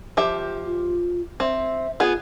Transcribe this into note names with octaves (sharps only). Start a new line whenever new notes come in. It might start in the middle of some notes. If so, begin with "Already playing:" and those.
F3 G4 E5
F4
C4 E5
B3 F4 G#4